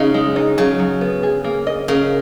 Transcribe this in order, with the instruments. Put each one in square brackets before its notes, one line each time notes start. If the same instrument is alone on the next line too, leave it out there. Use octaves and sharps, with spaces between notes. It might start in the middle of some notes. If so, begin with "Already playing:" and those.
Already playing: [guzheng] C#3 [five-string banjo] D#4
[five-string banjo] G#3
D#4
[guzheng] C#3 [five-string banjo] F#3
[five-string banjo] F#3
B3
G#4
A#3
D#5
[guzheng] C#3 [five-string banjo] A#4